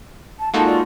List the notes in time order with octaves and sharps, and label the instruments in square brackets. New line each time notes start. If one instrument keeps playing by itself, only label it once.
[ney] A5
[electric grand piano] G#3 A#3 D#4 [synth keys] F4 F#4 A4 [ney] A5
[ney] D5